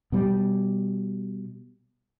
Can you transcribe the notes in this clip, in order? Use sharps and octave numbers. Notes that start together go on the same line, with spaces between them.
B2 G3